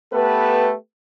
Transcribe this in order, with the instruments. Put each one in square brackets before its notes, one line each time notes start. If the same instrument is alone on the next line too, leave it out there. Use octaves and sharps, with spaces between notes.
[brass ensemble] A3 B3 G4 A4 B4